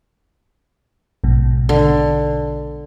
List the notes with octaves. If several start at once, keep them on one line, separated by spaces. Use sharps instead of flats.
A#1 G#2 B2
D3